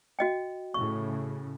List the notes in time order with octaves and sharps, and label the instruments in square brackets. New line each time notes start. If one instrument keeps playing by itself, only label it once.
[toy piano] F#4 D#5 G5
[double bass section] A2 C#3 [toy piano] C#6